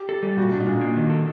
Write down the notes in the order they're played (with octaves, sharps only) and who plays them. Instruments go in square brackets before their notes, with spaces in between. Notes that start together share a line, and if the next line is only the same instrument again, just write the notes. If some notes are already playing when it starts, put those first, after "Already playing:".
Already playing: [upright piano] G4
[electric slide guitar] A4
G3
[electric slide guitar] A#2 [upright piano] F#4
[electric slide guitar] A#2 [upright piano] D4
[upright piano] D#4
[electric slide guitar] A#2 [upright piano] D4
[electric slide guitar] A#3
D#3
A4